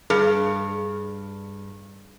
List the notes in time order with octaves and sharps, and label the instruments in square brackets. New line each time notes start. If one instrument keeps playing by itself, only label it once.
[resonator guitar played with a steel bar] G2 [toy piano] G#4